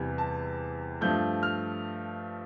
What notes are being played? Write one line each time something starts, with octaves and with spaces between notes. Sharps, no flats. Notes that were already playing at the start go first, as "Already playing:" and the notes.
Already playing: E2 C3 E3 G3
A5
G2 F3 A3 G6
F6